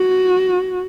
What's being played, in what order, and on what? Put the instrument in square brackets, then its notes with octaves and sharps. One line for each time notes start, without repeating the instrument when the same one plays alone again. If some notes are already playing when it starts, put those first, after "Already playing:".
Already playing: [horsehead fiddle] F#4